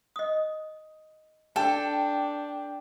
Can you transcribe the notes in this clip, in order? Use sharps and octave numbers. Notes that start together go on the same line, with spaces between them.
D#5 D#6
D4 A4 G5